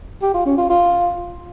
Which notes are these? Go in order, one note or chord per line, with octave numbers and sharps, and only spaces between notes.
G4
F4
C#4
F4
F4